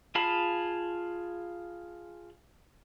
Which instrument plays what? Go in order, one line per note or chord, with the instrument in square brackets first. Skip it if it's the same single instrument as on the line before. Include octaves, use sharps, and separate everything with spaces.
[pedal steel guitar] F4 G#4 F5 A5 B5